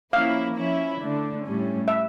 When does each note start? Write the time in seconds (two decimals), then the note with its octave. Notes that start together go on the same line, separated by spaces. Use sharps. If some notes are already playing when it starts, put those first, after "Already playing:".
0.13 F3 A#3 C#4 E4 F5
0.56 F3 C#4 E4
1.00 D3 A3 D4
1.44 A2 G3 C#4
1.88 E5